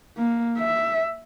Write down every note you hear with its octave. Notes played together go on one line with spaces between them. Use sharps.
A#3
E5